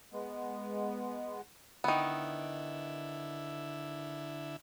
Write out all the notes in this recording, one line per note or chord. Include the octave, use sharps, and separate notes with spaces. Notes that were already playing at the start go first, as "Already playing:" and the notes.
G#3 B3
D3 D#3 B3 E4